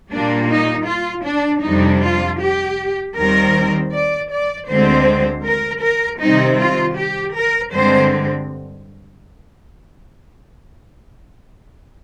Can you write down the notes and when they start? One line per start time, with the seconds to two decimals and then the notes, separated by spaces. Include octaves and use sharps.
0.12 A#2 G3 A#3 D4
0.50 D#4
0.88 F4
1.26 D4
1.64 F2 C3 G3 D4 D#4
2.02 F4
2.40 G4
3.16 D#2 D#3 G3 C4 A#4
3.92 D5
4.31 D5
4.69 D2 D3 G#3 C4 C5
5.45 A#4
5.82 A#4
6.21 C3 D#3 G3 C4 D#4
6.59 F4
6.97 G4
7.35 A#4
7.72 G2 D3 G#3 C4 C5